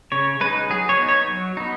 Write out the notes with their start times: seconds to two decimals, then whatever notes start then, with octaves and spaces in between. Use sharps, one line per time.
0.12 C#3 C#5
0.41 G#3 D#4 B4
0.70 F#3 G#4
0.89 C#5
0.99 B3 D#4
1.09 C#5
1.28 F#3
1.57 B3 D#4